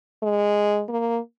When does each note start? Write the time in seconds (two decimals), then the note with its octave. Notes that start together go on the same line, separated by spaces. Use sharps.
0.23 G#3
0.89 A#3